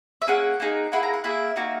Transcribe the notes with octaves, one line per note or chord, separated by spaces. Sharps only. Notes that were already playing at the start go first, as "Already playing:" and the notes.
E5
A#3 C#4 G#4 F#5
A#3 D#4 G#4
A#3 E4 G#4 F#5
A#5
F#5
A#3 E4 G#4 E5
A#3 D#4 F#4